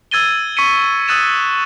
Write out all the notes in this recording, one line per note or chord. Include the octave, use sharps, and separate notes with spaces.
E6 G#6 A6 D#7 G7
C#6 B6 C#7 D#7
D#6 E6 F#6 A6 D#7 E7